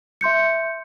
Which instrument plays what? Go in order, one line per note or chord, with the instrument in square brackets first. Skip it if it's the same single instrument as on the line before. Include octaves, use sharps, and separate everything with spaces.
[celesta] E5 C6 G6 C#7